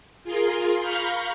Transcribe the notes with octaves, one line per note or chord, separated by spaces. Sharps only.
F4 G#4 A#4 C6
F5 A#5 B5 C#6 F6 G6